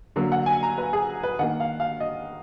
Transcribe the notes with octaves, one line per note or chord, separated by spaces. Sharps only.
D3 F#3 A#3
F#5
G#5
A#5
B4
G#4
B4
D#3 A#3 F#5
F5
F5
D#5